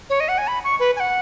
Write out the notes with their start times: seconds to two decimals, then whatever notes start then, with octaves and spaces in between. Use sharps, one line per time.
0.10 C#5
0.20 D#5
0.28 F#5
0.38 G#5
0.47 B5
0.64 C#6
0.80 B4
0.96 G#5
1.00 F#5